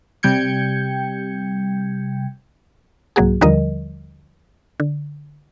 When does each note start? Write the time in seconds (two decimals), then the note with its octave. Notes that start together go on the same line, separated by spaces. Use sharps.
0.23 C3 G3 G5 G6 G#6 C#7
3.16 C2 G#2 F#3 A#3 F#4 G#4
3.41 D#2 D3 F3 G3 A#4 D#5
4.80 D3